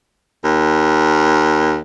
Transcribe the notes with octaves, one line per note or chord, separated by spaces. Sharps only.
D#2